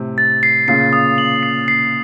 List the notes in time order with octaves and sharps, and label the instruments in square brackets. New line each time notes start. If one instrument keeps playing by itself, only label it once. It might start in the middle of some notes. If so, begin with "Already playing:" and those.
Already playing: [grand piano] A2 C3
[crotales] A6
C7
[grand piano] A#2 C#3 [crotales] C7
[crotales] D#6
F#7
C7
C7